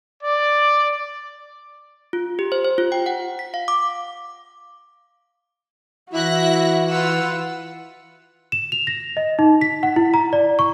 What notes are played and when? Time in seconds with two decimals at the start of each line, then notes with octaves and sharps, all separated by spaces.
0.22 D5
2.13 F4
2.39 G4
2.52 C5
2.65 C5
2.78 F4
2.92 G5
3.06 F#5
3.39 B6
3.54 F5
3.68 D6
6.13 E3 E4 F#4 E5 F#6 A#6
6.90 F4 B4 F#5 E6
8.52 E7
8.72 F7
8.87 A#6
9.17 D#5
9.39 D#4
9.61 B6
9.83 F#5
9.96 E4
10.14 A#5
10.33 D5
10.59 C#6